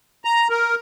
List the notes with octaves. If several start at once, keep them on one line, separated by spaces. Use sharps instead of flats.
A#5
A#4